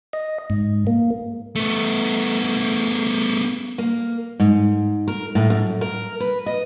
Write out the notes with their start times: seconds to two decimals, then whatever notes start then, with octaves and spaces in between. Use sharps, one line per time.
0.13 D#5
0.50 G#2
0.87 A#3
1.56 A3 B3
3.78 A#3
4.40 G#2
5.08 A#4
5.35 A2
5.50 F#2
5.81 A#4
6.20 B4
6.46 D#5